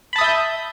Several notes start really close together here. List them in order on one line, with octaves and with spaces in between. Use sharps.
B5 A5 D#6 E5 G6